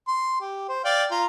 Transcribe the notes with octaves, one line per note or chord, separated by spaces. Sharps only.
C6
G4
C5
D5 F5 G5
F4 A#5